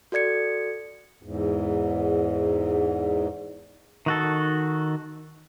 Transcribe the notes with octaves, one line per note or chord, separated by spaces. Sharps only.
F#4 A4 D5 G#6 C#7
E2 G#2
D#3 F#4 A4